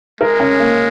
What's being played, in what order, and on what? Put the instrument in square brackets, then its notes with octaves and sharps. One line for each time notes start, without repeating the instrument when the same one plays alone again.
[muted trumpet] G#3 [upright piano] A#4
[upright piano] C#4
A#3